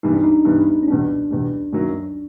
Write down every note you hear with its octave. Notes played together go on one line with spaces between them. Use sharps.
G2 E3 G3 B3 D#4
D4
D#4
G2 E3 G3 B3
C#4
E2 B2 G3 D4
E2 B2 G3
F#2 D#3 F#3 A#3